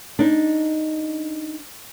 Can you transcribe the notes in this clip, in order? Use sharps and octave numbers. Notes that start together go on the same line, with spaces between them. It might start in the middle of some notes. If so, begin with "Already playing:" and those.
D4 D#4